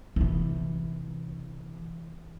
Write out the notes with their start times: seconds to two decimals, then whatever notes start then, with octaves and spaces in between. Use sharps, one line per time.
0.16 C3 E3